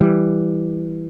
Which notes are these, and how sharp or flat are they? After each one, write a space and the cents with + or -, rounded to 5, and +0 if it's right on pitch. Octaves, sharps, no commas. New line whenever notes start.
E3 +0 G3 +0